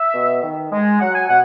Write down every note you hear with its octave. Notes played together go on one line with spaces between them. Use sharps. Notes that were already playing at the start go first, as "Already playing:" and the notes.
Already playing: E5
B2
D#3
G#3
F#3 F#5
G#5
B2 F#5